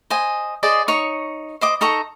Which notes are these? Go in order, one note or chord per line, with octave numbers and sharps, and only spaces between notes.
C5 D#5 G#5
G#4 C5 D5 D#5
D#4 C#5 C#6
C5 D#5 D6
D#4 A4 A#5 C#6